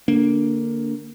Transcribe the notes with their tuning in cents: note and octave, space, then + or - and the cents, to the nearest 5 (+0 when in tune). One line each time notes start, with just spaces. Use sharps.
D3 -15 A#3 +0 D4 -10